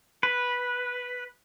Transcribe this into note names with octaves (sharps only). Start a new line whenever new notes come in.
B4